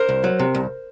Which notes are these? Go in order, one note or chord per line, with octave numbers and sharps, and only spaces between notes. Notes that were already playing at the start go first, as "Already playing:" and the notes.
Already playing: A#4 C5
C2
F#3
C3
C2